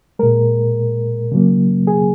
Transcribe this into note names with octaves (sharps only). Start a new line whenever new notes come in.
A#2 G#3 A#4
C#3 F#3 A#3
G#4